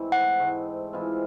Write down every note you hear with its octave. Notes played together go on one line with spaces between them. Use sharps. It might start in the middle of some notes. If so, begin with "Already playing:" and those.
Already playing: G#2 E3 A3 C4
F#5
G#2 E3 A3 C4
E3 G#3 C4 F4